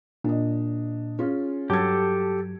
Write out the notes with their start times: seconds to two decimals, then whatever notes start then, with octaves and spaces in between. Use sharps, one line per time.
0.24 A#2 D4 D#5
1.19 C#4 F4 G#4
1.70 G2 F#3 G4 A4 A5 G#6